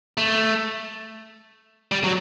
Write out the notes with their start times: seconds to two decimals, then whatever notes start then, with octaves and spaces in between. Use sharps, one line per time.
0.17 A3
1.92 G3
2.04 F#3